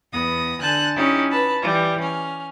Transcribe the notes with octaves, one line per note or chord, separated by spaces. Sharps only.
E2 B3 D#6 A#6
D3 G#5 A5 F#6 G6
C#4 D#4 E4 G4
B4 A5 B5
E3 G3
C#4 F6